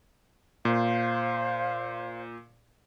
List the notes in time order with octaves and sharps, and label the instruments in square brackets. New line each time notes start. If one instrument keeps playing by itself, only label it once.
[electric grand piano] A#2 [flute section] C5 F5